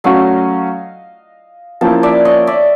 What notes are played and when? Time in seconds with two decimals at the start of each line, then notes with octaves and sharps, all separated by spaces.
0.04 F#3 A3 C#4 F#4 D#5 F5
1.81 F3 A#3 C#4 E4 G5 A5
2.03 D5 E5
2.25 C#5 D#5
2.47 D5 E5